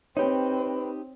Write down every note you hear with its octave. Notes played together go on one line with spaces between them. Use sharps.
C4 D#4 G4 B4 C#5